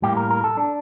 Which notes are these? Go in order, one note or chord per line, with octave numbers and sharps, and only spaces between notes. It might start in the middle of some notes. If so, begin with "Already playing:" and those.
A2 G3 A#3 G4
A#4
A#4
A4
D4